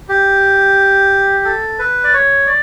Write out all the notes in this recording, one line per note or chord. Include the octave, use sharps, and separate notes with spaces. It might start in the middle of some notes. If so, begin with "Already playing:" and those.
G4
A4
B4
D5
C#5
D5